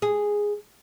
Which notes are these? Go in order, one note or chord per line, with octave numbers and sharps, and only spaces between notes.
G#4